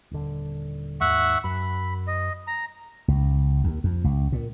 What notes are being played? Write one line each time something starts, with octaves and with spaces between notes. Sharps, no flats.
D#1 D3
D#2 G#2 E5 F#5 C#6
F#2 B5
D#5
A#5
C#2
D#2
F2
C#2
A#2